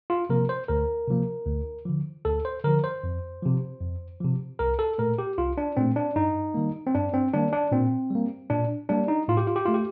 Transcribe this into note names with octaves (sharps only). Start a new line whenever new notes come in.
F4
C3 F3 A#3 A#4
C5
D2 A#4
C3 F3 A#3
D2
D3 F3
D2 A4
C5
D3 F3 A#4
C5
F2
C3 F3
F2
C3 F3
C2 A#4
A4
A#2 A3 A#4
G4
C2 F4
D4
A#2 A3 C4
D4
G2 D#4
D#3 G3 A#3
C4
G2 D4
C4
D#3 G3 A#3 D4
D4
A#2 C4
G3 A#3
A#2 D4
G3 A#3 D4
D#4
A2 F4
G4
F4
G4
A3 F4
G4